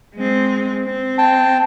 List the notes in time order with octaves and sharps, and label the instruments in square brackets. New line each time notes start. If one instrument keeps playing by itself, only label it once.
[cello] G#3 C4
C4
[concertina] G5 A5